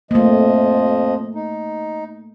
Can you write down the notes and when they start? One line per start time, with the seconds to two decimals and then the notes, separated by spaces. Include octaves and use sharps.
0.11 F2 F3 A3 A#3 D#5
1.35 D#4